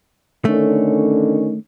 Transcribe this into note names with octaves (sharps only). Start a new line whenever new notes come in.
D3 D#3 A3 C#4